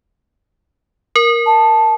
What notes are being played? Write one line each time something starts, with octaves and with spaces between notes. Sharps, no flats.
A#4
A5